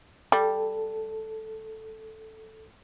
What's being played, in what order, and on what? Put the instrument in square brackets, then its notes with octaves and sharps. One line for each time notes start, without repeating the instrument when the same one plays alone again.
[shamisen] G3 [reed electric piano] A4